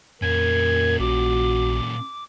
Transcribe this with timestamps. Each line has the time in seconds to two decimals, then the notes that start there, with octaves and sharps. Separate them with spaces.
0.22 F2 A#2 C#4 A#4 G#6
0.99 A#1 F#4 D6